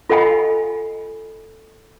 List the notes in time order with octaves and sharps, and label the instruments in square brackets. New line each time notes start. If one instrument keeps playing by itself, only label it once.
[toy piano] F4 A4 D#5 F#5 G#5 B5